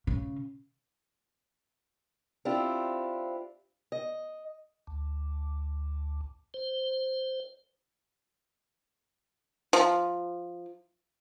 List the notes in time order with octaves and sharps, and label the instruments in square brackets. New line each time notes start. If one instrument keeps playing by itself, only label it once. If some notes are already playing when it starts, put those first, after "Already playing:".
[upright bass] C#3
[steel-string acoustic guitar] C4 D4 E4 F4 G4
D#5
[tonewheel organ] D2
C5
[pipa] F3